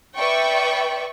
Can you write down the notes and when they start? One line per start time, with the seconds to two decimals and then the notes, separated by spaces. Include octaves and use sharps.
0.16 B4 D5 E5 G5 C#6